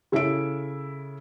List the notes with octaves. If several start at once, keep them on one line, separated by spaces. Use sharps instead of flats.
C#3 E4 A4 E5 D7